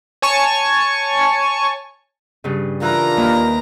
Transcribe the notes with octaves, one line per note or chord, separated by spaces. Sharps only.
C#5 G#5 A5 C#6
G2 C#3
E3 D4 F4 A#4 A#5 F#6
D#2 B4